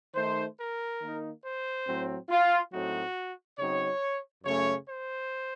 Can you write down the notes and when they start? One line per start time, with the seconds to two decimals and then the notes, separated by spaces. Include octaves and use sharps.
0.15 D#3 A3 D#4 C5
0.58 A#4
1.01 D#3 A#3 D#4
1.43 C5
1.86 A2 F#3 C4
2.29 F4
2.72 A2 F#3 A3 C4 D#4 F#4
3.59 C#3 F#3 C4 D#4 C#5
4.44 F#2 C#3 A3 C#4 C#5
4.87 C5